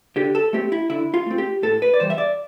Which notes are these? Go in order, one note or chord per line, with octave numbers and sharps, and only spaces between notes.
D3 G4
A4
A3 C4 G4
E4
D3 E4
F4
A3 C4
G4
A2 A4
B4
D5
E3 G3 C5
E5
D5